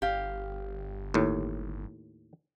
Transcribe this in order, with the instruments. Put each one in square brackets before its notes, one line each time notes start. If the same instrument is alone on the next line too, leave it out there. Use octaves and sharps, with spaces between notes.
[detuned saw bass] G1 [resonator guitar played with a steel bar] G4 F5
[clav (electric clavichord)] D#2 A2